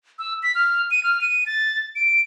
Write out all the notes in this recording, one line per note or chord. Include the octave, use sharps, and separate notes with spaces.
E6
B6
F6
D#7
F6
D#7
A6
D7